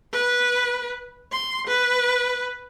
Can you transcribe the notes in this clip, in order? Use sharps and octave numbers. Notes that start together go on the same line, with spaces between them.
B4
C6
B4